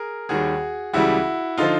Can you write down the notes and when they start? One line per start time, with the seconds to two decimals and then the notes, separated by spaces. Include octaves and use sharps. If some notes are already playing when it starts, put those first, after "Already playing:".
Already playing: G#4 A#4
0.29 D#2 D#3 G3 F#4 G#4
0.93 C#2 C#3 E3 G3 E4 F#4
1.58 D3 F3 D#4 F4